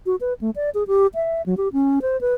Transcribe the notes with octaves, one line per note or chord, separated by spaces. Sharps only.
F#4
B4
A3
D5
G#4
G4
E5
F#3
G4
C#4
C5
B4